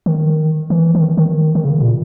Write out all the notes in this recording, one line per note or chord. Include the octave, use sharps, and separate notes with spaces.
D#3
E3
E3
D#3
D#3
D#3
C#3
A#2